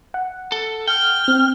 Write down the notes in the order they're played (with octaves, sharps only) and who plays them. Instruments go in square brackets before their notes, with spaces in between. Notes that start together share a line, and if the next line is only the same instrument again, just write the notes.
[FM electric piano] F#5
[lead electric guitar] A4
[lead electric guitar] G5 [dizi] F6
[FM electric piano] C4